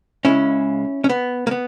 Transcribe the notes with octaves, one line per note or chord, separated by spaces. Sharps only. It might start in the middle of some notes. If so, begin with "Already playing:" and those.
C#2 C#3 G#3 C#4 E4
C#4
B3
A#3
B3